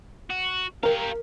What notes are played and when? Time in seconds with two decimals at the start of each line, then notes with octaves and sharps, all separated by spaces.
0.30 F#4
0.83 G4 A#4 F5